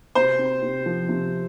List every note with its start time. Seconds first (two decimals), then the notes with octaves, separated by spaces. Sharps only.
0.15 C3 C5
0.39 C4
0.63 C3
0.86 F3
1.09 C3